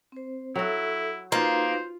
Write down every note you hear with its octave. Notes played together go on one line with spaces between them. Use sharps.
C4 C5
F#3 E4 F#4 A4 E5
A#3 D#4 F4 F#4 B4 C5